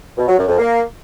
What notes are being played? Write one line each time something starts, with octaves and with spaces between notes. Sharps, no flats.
B2
F#3
F#2
F2
A#3